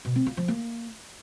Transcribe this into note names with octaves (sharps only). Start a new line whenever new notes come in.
B2
C4
F4
F3
A#3